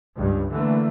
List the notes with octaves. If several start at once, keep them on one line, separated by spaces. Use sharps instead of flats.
C#2 G2
D3 E3 A3 A#3